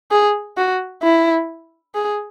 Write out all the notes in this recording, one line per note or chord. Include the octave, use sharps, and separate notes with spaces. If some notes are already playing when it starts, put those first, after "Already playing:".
G#4
F#4
E4
G#4